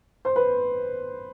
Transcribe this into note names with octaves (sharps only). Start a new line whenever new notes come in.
C5
B4